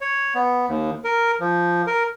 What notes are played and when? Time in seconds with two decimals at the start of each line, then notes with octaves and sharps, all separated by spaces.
0.01 C#5
0.35 B3
0.69 D#2
1.04 A#4
1.40 F3
1.87 A#4